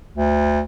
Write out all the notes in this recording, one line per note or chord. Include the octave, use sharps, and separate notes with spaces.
D2